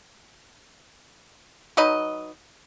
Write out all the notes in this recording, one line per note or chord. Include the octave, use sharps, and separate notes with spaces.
F#3 D#4 B4 D#5